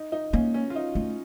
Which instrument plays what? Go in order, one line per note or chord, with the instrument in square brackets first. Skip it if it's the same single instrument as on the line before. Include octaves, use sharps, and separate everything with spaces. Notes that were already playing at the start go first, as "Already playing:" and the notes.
Already playing: [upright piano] D#4
D#4
[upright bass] A#3 [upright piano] C#4
[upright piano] C#4
F4
D#4
[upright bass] A3